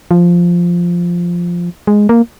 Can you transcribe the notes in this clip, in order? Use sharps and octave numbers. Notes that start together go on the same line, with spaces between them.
F3
G#3
A#3